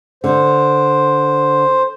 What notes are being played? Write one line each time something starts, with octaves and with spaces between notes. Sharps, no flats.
D3 C5